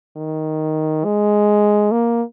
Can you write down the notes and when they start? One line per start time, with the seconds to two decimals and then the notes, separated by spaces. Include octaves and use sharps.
0.16 D#3
1.04 G#3
1.92 A#3